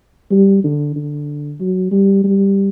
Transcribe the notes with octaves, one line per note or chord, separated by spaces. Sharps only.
G3
D3
D3
F#3
G3
G3